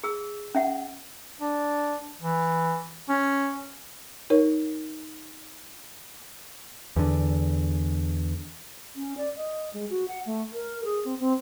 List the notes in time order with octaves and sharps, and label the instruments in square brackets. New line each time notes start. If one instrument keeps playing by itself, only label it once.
[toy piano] G#4 E6
C#4 E5 F#5
[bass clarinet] D4
E3
C#4
[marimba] D#4 A#4 C#5
[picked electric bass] E2 D3
[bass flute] C#4
D5
D#5
G#3
F#4
F#5
A3
A#4
G#4
C4
C4